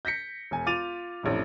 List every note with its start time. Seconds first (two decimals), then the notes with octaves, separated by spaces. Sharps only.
0.05 G6 A#6 B6 C#7
0.51 E1 G#5
0.66 F4 D6 A6 D#7 F7
1.23 A1 F2 D3 E4